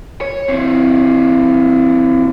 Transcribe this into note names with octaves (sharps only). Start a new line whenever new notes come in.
C#5
E3 C4